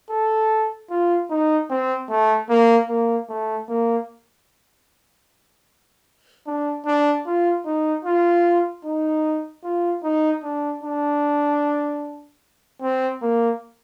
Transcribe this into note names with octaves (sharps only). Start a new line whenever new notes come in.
A4
F4
D#4
C4
A3
A#3
A#3
A3
A#3
D4
D4
F4
D#4
F4
D#4
F4
D#4
D4
D4
C4
A#3